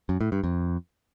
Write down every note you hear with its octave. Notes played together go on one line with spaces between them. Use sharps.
F#2
A2
G2
F2